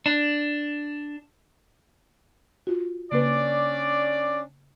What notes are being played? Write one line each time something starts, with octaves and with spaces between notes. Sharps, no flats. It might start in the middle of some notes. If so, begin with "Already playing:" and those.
D4
F4 F#4
C#3 A#3 C#4 D4 B4 D5